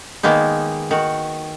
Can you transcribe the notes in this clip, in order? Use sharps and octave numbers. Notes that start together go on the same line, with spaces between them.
D#3 G#3 A#3 B3 D#4
D#3 F#4